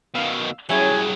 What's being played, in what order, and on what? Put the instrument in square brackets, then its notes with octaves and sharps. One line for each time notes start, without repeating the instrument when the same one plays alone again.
[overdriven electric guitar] B2 D#3 [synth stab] F5 E6
[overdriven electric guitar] G2 F#3 [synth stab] C#4 E4 C#5 [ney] G#4 [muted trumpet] G#5